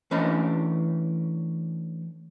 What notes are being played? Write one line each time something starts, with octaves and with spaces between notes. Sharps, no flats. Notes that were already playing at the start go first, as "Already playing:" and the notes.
E3 A3 C#4 D4 D#5 B5